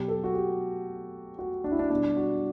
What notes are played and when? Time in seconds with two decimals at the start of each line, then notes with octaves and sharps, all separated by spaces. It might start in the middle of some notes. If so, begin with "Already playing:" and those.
Already playing: B2 F#3 G4
0.08 A4
0.24 F#4
0.34 G4
1.39 F#4
1.64 D4
1.72 E4
1.79 D4
1.90 B2 G3 D4
2.17 F#4